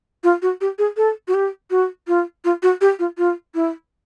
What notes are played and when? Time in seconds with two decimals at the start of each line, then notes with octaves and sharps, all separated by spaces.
0.24 F4
0.42 F#4
0.61 G4
0.78 G#4
0.97 A4
1.28 F#4
1.34 G4
1.71 F#4
2.08 F4
2.45 F4
2.63 F#4
2.81 G4
2.99 F4
3.18 F4
3.55 E4